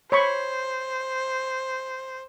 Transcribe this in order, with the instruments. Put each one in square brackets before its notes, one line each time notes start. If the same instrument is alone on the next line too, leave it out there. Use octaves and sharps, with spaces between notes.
[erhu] C5 [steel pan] C#5 B5 C#6